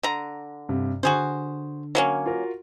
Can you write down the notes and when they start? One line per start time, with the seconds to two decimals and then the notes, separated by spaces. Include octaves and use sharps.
0.03 D3 A#5
0.69 G2 C3
1.03 D3 F#4 G#4 C5
1.95 F#3 A#3 C#4
2.26 F4 F#4 A#4